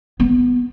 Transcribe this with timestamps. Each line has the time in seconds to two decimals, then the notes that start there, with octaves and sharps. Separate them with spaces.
0.20 B3